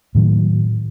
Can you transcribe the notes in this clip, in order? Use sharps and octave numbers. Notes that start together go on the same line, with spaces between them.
A2 D#3 F#3